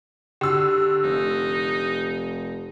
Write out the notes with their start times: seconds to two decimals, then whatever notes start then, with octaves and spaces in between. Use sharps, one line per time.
0.41 D3 G4 E6
1.03 F1 D#4